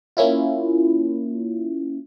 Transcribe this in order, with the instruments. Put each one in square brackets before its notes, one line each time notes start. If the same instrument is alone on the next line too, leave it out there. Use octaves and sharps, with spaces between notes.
[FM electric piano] A#3 C#4 E4 F4